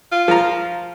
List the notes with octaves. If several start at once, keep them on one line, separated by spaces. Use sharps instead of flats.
F4
F3 A#5